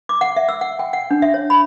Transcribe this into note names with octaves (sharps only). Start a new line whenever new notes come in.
D6
F#5
E5
E6
F#5
G5
F#5
D4
E5
C#5
B5